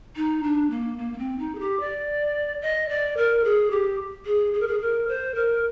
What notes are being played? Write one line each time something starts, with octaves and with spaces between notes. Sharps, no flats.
D#4
D4
A#3
A#3
A#3
C4
D#4
G#4
G4
D5
D#5
D5
A#4
G#4
G4
G#4
G#4
A#4
G#4
A#4
C5
A#4